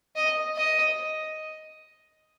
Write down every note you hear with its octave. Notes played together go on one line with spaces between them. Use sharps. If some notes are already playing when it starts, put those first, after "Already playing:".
D#5
D#5